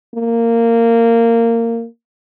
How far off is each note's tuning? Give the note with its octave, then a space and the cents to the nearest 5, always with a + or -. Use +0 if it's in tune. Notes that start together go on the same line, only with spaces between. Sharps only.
A#3 -15